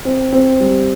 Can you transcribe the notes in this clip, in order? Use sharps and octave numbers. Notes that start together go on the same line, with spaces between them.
C4
C4
G3